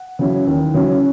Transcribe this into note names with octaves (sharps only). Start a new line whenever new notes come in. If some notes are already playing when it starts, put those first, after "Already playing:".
Already playing: F#5
C#3 F#3 C#4 E4
D#2
C#3 F#3 C#4 E4